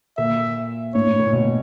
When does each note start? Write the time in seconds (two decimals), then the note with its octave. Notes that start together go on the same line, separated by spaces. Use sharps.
0.17 A#2 E5
0.94 A2 C#5
1.07 A2
1.20 A#2
1.33 B2